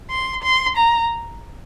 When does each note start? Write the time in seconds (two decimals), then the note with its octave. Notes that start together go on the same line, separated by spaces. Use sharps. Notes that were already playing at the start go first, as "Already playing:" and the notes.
0.10 C6
0.43 C6
0.77 A#5